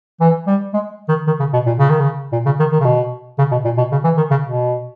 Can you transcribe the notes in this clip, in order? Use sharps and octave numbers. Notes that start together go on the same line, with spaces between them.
E3
G3
G#3
D#3
D#3
C#3
B2
A#2
C#3
D#3
C#3
A#2
C#3
D#3
D#3
C#3
B2
C#3
B2
A#2
B2
C#3
E3
D#3
C#3
B2